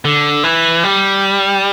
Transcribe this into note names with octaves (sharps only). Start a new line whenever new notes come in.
D3
E3
G3